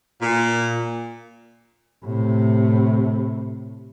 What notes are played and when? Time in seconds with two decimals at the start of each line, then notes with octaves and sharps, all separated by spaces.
0.21 A#2
2.04 A2 C3